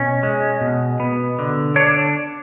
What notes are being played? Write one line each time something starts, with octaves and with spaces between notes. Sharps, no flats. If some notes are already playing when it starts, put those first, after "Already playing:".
Already playing: B2 C#4
G#3
B2
B3
D3
D4 C#5